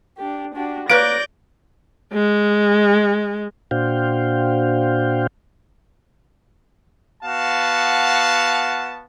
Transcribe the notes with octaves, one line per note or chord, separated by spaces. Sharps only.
D4 G4
D4 F#4 G4
A#3 B4 C#5 D5 G6 A#6 D7
G#3
A#2 D4 F#4 C5 F5 G5
B3 F#4 F5 A5